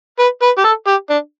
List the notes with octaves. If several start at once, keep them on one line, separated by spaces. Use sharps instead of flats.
B4
B4
G4
A4
G4
D4